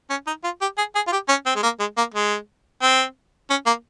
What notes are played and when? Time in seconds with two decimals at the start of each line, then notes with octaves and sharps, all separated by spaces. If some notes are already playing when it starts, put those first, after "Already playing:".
0.10 C#4
0.27 D#4
0.44 F4
0.61 G4
0.78 G#4
0.95 G#4
1.07 F4
1.12 G4
1.29 C#4
1.46 C4
1.56 G#3
1.63 A#3
1.80 G#3
1.97 A#3
2.14 G#3
2.82 C4
3.50 C#4
3.66 A#3